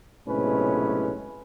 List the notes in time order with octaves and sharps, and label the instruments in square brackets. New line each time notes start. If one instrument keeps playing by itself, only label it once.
[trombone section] B1 A2 C3 G#3 C#4 B4